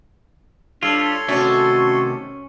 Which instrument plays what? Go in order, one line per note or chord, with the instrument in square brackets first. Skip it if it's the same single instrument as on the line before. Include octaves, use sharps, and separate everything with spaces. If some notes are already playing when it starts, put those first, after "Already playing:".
[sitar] G3 [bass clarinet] D4 [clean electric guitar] F4 [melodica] A4 C#5 C6
[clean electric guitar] C3 D#3 A3 [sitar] C#4 [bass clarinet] F#4